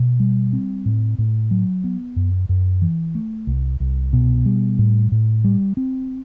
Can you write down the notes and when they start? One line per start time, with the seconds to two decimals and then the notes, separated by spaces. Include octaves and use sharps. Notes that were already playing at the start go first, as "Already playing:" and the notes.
Already playing: B2
0.20 G3
0.53 C4
0.86 A2
1.18 A2
1.51 F#3
1.84 B3
2.16 F#2
2.49 F#2
2.82 E3
3.15 A3
3.47 C2
3.80 C2
4.13 B2
4.46 G3
4.79 A2
5.12 A2
5.44 G3
5.77 C4